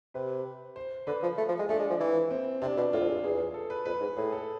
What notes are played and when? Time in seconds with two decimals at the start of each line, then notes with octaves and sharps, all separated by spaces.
0.14 C3 B4
0.76 C5
1.07 D3 B4
1.22 F3
1.38 A3
1.49 F3
1.59 G#3
1.69 A3 D4
1.79 G#3
1.90 F3
2.00 E3
2.31 C4
2.62 C3 D4
2.77 B2
2.93 A2 F4
3.00 F2
3.08 E2
3.23 E2 G#4
3.54 A4
3.70 B4
3.85 F2 B4
4.01 G#2
4.17 A2 G#4
4.32 A4